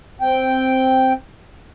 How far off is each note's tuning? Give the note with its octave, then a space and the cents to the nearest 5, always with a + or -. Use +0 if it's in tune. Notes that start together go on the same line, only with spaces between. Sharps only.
C4 +0 G5 -5